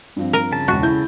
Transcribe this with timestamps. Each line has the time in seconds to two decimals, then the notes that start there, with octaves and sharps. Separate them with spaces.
0.16 G2 F3 C4
0.33 A#4
0.52 C#3 A5
0.68 E1 C#2 F#4
0.83 E4 G6